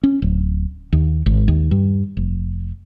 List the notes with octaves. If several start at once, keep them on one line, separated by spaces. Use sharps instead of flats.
C#4
D1
D#2
G#1
D#2
G2
F1